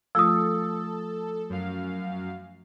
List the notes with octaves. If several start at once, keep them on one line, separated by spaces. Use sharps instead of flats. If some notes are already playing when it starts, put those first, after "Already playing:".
F3 A3 F4 A4 D#6 E6
F#2 F5